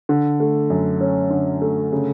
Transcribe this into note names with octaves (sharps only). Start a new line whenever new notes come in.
D3
A3
F#2
C#4
D3
A3
C#3